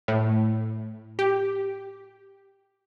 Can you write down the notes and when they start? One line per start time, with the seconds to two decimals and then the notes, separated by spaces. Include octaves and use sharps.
0.08 A2
1.19 G4